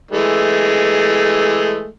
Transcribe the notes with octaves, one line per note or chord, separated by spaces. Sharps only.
E3 G#3 A3